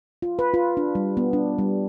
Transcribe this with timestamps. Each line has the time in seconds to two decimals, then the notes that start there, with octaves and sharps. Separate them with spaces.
0.22 F4
0.39 B4
0.54 F4
0.77 D4
0.95 G3
1.17 B3
1.33 D4
1.59 G3